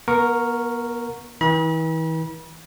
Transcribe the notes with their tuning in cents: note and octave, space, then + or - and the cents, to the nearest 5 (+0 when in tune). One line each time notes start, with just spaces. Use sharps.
B3 -40 A#4 +0 C#6 +0
E3 -40 B5 -40